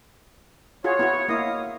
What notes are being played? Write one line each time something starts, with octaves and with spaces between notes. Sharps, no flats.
F4 F#4 G#4 C#5
B3 E4 F#4
A#3 E4 D#5 F5 D#6